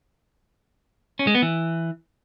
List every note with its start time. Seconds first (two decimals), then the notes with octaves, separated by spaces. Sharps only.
1.19 C#4
1.27 G#3
1.35 B3
1.42 E3